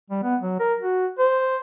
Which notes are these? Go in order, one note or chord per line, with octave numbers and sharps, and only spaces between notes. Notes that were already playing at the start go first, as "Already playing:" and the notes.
G3
B3
F#3
A#4
F#4
C5